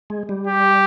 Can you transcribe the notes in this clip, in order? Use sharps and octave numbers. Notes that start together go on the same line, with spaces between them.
G#3
G3
G4